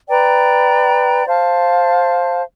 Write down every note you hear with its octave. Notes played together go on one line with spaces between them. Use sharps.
B4 D5 G5 A#5
C5 F5 A5